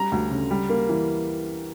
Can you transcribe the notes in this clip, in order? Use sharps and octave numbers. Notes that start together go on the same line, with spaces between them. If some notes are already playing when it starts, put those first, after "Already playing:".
Already playing: G3 A#5
D2
C#3
G3
A#3
E3